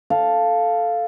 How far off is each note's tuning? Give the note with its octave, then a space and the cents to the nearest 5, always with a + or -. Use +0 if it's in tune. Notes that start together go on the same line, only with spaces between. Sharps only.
A4 +0 F5 +0